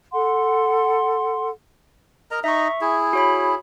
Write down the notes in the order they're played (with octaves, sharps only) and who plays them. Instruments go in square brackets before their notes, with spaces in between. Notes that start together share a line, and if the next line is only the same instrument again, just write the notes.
[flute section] A4 F#5 C6
[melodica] A#4 D#5 A#5
[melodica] D#4 D#5 [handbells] E5 C#6
[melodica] E4 G#4
[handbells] F#4 C#5 B5